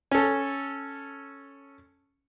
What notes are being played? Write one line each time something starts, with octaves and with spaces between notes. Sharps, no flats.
C#4 A4